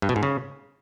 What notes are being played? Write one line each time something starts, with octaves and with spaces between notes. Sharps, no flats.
G2
B2
G#2
C#3